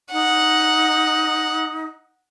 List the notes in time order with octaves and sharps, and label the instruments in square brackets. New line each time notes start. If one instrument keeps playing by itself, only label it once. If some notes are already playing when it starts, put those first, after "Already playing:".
[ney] D#4 [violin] F#5